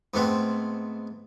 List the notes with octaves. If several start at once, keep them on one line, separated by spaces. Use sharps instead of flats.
G#2 A3 B3 C4